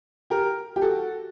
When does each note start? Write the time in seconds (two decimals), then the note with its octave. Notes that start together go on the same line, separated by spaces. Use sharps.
0.30 G4 A#4
0.76 G4
0.82 F#4 A4